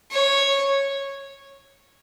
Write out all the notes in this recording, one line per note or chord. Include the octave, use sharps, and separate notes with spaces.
C#5